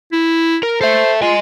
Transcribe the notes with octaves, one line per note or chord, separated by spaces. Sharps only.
E4
A#4
A4 C5 E5
F4 D#5 G#5